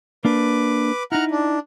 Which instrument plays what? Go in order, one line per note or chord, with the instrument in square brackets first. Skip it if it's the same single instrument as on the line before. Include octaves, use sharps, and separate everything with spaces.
[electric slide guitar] A#3 D4 [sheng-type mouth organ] B4 D6
[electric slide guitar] D#4 E4 [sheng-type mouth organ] F#5 A#5 F6
[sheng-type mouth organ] D4